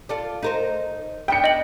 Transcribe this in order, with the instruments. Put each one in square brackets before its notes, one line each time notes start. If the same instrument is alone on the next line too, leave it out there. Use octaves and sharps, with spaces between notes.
[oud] F4 A4 D5
D#4 A#4 C5
[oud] B3 D4 [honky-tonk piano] G5 C#7
[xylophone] D#5 F#7